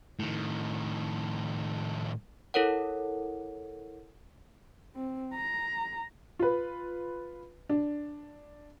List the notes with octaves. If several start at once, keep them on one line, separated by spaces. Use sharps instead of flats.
A2 D#3
E4 A4 A#4 C#5 F#5
C4
A#5
F4 B4
D4